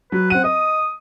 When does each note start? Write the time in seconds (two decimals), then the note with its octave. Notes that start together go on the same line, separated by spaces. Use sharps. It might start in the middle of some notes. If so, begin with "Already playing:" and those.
0.12 F#3 B4
0.30 C4 F#5 D#7
0.44 D#5 D#6